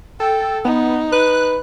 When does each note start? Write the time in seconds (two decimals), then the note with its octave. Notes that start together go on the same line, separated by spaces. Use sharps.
0.20 A4 G5
0.65 B3 D#4
1.12 B4 F#6